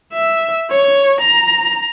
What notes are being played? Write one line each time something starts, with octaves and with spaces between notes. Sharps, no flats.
E5
C#5
A#5